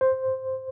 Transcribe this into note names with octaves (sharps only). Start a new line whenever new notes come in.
C5